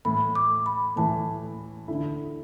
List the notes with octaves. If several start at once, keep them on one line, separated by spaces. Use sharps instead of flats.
A2 E3 A3 B5
D6
B5
A2 E3 A3 A5
D3 A3 E4